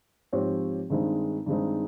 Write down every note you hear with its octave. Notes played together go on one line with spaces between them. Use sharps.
G#2 F3 C4 G4 C#5
G2 D#3 G#3 C4 D#4
G2 D#3 G#3 C4 D#4